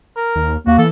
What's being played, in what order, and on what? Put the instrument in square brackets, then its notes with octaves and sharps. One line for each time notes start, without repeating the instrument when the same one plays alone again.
[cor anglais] A#4
[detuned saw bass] D#2
[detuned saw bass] D#2 [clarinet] A#3 [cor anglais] F#4
[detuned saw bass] E3 [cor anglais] A4